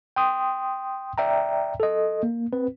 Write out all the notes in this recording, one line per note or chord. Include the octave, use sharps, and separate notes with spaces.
G5 C6 D#6
D5 E5 G5 A#5
A4 D#5
A#3
C4 B4